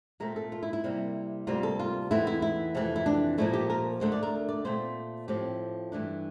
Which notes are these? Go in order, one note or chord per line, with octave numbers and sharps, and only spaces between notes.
A#2 A3 C4 A#4
A4
F4
E4
E4
C3 G3 A#3
D2 C3 G3 A#3 F4
A4
F4
E2 E3 A3 C4 E4
E4
E4
F2 C3 E3 A3
E4
D4
A#2 F3 A3 E4
G4
A#4
D2 D3 A3 D4 C5
D5
A#4
D5
A#2 A3 C4 C5
A2 F3 C4 G4
G2 E3 A3 D4